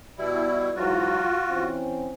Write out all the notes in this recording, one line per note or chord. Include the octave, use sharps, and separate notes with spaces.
B2 G3 E4
G#2 E3 F#3 F4 F#4
E3 C4 C#4